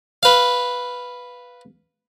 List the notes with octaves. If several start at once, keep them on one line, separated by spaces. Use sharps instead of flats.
B4 F5